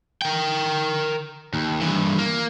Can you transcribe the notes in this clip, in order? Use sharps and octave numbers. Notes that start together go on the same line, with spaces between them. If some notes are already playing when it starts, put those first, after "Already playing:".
A#4 G5
D#2
G2 E3
A#3